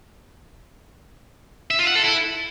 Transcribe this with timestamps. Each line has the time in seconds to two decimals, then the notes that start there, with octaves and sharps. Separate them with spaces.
1.71 E5
1.79 F4
1.87 F#5
1.95 A4
2.04 E4